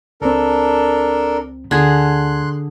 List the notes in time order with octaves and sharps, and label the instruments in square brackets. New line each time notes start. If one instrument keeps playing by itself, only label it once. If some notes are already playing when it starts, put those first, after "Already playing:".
[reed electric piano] C#2 C4 [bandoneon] D4 A4 A#4
[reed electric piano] D2 G#6 [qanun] D3 G#4 [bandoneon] C6 F#6